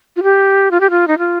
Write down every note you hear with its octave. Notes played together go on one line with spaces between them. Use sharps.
F4
G4
F4
G4
F4
D#4
F4